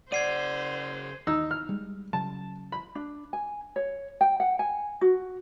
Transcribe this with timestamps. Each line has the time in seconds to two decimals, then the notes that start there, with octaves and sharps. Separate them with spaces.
0.12 C#3 C5 D5 F#5 G#6 C7 D#7
1.27 D#2 D#4 E6
1.51 F6
1.69 G3 G#3
2.13 C#3 F#3 A5
2.72 B5
2.95 D4
3.33 G#5
3.76 C#5
4.21 G5
4.40 F#5
4.59 G#5
5.01 F#4